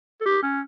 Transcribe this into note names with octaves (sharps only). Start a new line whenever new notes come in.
A4
G4
C#4